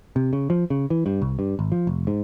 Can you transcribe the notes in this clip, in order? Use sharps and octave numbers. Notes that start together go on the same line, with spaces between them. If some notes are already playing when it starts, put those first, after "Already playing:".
C3
C#3
F3
C#3
E3
G2
C2
G2
G#1
F3
F1
G#2